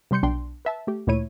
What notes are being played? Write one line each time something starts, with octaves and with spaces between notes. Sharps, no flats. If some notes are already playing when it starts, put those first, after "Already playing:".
C3 G3 C6 G6 C#7
B1 D4 G5 C6
B4 E5 A5
A3 G4
D2 A#2 A3 E4 C#5 D#7